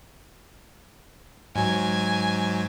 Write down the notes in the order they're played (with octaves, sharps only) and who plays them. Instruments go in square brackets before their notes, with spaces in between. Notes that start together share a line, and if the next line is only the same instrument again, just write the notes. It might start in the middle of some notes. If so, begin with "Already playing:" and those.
[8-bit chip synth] G#2 F#3 [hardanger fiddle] G#5